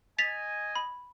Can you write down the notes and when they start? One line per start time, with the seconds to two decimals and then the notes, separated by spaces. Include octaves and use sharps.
0.18 D#5 G#5 A6 B6 F7
0.75 B5